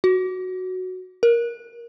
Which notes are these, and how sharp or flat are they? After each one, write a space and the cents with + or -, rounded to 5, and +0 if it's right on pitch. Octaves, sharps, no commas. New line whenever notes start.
F#4 +0
A#4 +10